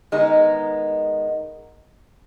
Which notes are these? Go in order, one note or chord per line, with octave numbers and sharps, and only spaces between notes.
D#3 G#3 B3 D#4